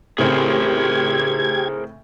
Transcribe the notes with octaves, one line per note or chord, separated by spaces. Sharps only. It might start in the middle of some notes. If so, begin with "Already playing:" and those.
A2 C#3 C4 G4 G#4 A#4 C5 G#6